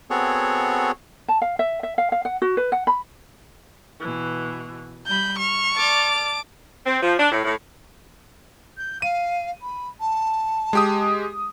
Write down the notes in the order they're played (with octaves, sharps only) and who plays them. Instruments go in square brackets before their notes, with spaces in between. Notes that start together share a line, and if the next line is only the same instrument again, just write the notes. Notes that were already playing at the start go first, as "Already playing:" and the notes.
[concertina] B3 C4 F#4 G#4 A4 C#5
[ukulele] A5
F5
E5
E5
F5
F5
F#5
F#4
B4
F#5
B5
[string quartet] B2 E3
[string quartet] G3 B5 [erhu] G6
[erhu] C#6 [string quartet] F6
[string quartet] D5 F6 A6 [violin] A5 D6
[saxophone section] C4
F3
D4
A2
A2
[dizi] G6
[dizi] F5 [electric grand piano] D#7
[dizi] B5
A5
[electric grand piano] G#3 G4 D#6